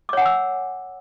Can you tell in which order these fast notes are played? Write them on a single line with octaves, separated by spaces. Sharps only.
D6 C#5 F#5 G#5 E6